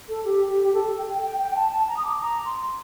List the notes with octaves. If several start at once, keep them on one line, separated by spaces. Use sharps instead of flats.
A4
G4
G4
G4
A4
G5
G5
G5
G5
A5
A5
A#5
D#6
D6
A#5
C6